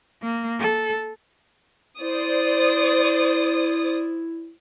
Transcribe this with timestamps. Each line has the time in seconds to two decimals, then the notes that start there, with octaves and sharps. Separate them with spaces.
0.23 A#3
0.59 A4
2.00 E4 C5 D5 D#6